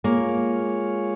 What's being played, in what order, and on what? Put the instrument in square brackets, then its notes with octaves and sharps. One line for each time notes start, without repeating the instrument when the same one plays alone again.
[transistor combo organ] G#3 F4 G#4 C#5 [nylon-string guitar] A#3